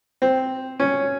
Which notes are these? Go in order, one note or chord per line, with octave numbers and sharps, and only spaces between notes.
C4
C#4